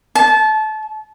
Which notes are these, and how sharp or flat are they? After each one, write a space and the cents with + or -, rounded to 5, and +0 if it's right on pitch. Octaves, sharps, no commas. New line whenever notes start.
A5 -25